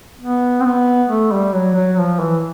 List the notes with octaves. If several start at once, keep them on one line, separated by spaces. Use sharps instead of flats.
B3
C4
B3
A3
G3
F#3
F#3
F3
E3